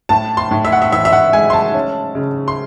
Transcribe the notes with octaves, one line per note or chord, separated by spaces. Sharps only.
A2 A5
C6
A2
E5
F#5
E5
E3 E5
E5
F#5
G#3 G#5
C6
A5
C#4
C#3
C6